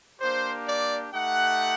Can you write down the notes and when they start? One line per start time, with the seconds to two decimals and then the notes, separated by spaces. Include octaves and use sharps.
0.20 A#3 D4 G4 C5
0.66 D5
1.11 A3 D#4 G4 F#5